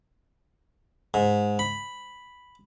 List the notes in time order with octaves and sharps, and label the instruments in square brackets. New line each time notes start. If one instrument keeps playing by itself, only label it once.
[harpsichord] G#2
B5